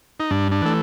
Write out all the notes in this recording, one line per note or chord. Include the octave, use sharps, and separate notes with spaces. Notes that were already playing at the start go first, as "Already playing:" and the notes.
D#4
G2 D4
D4
E3 A3